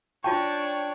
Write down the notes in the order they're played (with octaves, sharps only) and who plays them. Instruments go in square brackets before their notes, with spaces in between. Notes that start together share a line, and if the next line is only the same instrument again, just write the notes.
[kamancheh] D4 C#5 [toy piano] F4 A5 C#6 [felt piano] G5